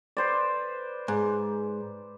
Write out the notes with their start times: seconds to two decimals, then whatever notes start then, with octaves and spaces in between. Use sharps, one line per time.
0.17 B4 C5 D5
1.08 G#2